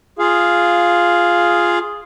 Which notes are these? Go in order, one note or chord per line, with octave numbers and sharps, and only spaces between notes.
F4 G#4 F5